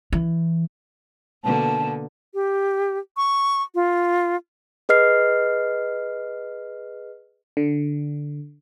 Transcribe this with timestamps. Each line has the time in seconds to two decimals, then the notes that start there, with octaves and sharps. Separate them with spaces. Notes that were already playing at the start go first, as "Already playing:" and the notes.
0.13 E3
1.44 B2 D3 A#3 A5
2.34 G4
3.17 C#6
3.75 F4
4.89 G#4 B4 D#5 F6 C7
7.57 D3